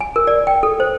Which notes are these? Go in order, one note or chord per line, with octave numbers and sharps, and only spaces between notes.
G#5
A#4
D5
G5
A4
C5